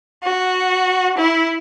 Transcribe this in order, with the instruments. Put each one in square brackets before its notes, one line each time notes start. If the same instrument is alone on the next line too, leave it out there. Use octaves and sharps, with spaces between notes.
[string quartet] F#4
E4